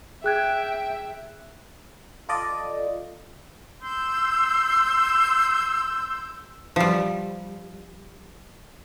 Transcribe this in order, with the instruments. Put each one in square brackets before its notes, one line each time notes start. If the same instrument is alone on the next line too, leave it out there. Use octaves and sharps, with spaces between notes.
[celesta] G#4 F#6 G#6 [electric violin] E5 [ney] G5
[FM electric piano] F4 A4 D5 D#5
[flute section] C6 E6 G6
[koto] F3 G3